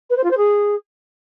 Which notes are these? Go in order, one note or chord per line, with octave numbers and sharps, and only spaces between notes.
B4
C5
F4
C5
G#4